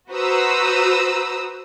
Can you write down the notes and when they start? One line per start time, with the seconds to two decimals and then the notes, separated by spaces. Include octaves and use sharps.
0.11 F#4 B4 C5 A#5 D#6 E6